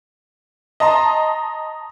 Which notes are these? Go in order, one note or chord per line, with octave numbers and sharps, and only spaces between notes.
D#5 A5 A#5 C6